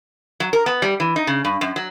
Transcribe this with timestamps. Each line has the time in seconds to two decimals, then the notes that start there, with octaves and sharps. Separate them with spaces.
0.40 F#3
0.53 A#4
0.66 B3
0.82 G3
1.00 E3
1.16 D#4
1.27 C#3
1.45 G2
1.61 F#2
1.76 F#3